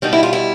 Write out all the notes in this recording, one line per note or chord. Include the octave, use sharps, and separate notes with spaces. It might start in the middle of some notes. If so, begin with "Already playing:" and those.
B2 G3 D#4
E4
F4
E4